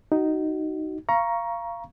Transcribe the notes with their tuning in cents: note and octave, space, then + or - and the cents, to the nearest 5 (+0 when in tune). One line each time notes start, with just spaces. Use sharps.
D#4 +0 F#4 +25
F5 -20 A#5 +15 C#6 +0